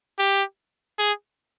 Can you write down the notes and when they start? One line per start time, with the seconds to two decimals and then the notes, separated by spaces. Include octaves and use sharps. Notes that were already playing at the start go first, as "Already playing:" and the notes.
0.19 G4
0.99 G#4